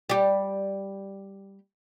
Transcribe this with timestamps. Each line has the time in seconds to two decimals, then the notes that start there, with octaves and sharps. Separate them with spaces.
0.09 G3 G4